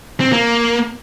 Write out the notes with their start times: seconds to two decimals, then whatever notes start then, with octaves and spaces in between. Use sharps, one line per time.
0.20 C4
0.32 A#3